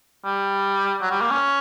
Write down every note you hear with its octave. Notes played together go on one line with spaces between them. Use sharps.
G3
F#3
G3
A#3
C#4